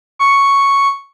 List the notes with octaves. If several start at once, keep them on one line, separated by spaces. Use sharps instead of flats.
C#6